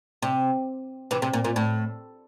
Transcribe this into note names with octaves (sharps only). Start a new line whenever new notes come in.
C3
C3 E3
C3
A#2
A#2
A2